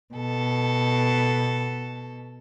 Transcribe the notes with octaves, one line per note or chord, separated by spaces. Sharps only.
B2 A4